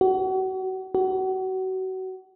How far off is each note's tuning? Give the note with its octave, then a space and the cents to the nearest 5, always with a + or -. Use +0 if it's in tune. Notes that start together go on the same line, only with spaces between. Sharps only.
F#4 +35
F#4 +30